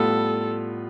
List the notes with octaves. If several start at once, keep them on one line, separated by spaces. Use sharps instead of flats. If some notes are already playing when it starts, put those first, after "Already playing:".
Already playing: A2 G3 B3 F4 A4